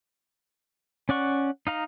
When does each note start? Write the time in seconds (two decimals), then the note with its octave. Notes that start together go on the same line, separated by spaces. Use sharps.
1.09 C#4 D5 F#5 C#6
1.67 D#4 F5 A#5